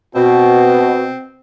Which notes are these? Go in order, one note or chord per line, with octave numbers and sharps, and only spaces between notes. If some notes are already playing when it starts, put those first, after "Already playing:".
B2 C4 F#4